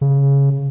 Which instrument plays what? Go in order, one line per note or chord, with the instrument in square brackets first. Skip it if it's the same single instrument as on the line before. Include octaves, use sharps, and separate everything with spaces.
[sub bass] C#3